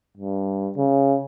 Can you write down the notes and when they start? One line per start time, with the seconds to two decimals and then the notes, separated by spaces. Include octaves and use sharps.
0.17 G2
0.77 C#3